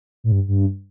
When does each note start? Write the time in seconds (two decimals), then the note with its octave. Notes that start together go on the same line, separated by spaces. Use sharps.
0.24 A2
0.32 G2
0.48 G2